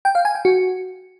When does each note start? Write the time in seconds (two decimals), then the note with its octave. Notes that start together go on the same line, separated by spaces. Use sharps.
0.05 G5
0.15 F5
0.25 G#5
0.35 G5
0.45 F#4